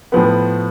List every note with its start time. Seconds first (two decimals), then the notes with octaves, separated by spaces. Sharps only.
0.12 A2 F3 B3